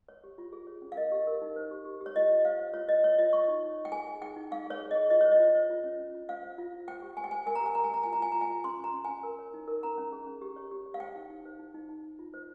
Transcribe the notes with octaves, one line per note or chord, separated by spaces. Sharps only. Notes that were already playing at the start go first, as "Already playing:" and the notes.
C#5
G4
F4
G#4
C#5
C#4
F5
A#4 D#5
G4
A#4
D#4
C5
G4
G4
G4
C#5
F4 D#5
F4
C5 F5
C5
F4 C#5
C#5 D#5
C#5
F4 D#5
C#5 C#6
D#4
D#4
C#5
G5
G#4 G#5
G#4
D#4 G5
D#4
G#4 F5
G#4 C#5
G#4
D#5
G#4
F4 D#5
C5 C#5
D#5
F4
C5
F4
C#4
C#4
F4
C5 F5
C5
F4 F5
F4
C5 G5
G4
C5 G#5
G5
C5 G#5
A#4 G#5
A#5
G4 G#5
A#4 A#5
G#5
A#4 A#5
F4 G#5
A#5
F4 G#5
F4 A#5
G#5
F4
C#4 C6
C#4 A#5
C#4
C#4 G#5
A#4
C#5
D#4
A#4
C#4 A#5
C#4
G#4
C#4
G4
C#5
G4
C#5
F5
C5 G5
D#4
D#4
C5
D#4
D#4
D#4
D#4
F4
C5